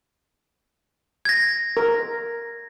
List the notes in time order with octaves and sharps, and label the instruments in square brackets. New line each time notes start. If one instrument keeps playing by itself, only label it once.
[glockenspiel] G#6 A#6
[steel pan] A#4